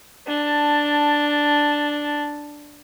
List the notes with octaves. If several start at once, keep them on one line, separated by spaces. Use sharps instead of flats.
D4 A5